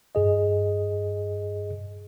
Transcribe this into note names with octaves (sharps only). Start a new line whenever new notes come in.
G2 G#4 D#5